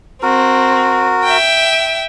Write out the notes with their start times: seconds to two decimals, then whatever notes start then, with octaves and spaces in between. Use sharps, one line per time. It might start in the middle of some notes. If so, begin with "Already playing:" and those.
0.23 C4 F#4 A#4
1.24 E5 G5